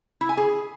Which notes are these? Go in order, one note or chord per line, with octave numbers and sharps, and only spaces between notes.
E4
G#5
G#4